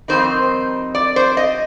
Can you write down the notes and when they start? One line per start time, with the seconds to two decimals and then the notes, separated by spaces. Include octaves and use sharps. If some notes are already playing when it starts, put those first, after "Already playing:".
0.08 F2 D#3 G3 C4 D#4 C5
0.95 D5
1.16 C5
1.37 D#5